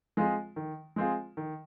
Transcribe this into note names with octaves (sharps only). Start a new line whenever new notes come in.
G#3 C4 F4 G#4
D#3
G#3 C4 F4 G#4
D#3